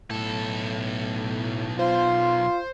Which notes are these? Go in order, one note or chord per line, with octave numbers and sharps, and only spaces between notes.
B1 A2 A4
F4 C5